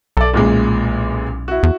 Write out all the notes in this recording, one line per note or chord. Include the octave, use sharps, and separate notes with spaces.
B1 A4 D5
A1 A#2 G#3
E4 F#4
E2